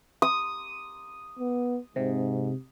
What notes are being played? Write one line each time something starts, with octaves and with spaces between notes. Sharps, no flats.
D#6
B3
G#2 C3